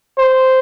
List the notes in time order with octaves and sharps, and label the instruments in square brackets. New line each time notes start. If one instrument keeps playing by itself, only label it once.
[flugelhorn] C5